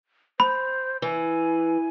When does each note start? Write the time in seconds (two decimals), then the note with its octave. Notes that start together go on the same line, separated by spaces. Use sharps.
0.40 C5 B5
1.02 E3 G#5